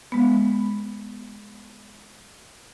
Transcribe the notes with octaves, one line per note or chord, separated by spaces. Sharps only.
G#3 B3